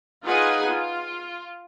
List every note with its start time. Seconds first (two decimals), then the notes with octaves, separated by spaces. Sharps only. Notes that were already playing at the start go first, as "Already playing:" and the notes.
0.24 D#4 F4 G#4 B4 F#5 G#5
0.70 F4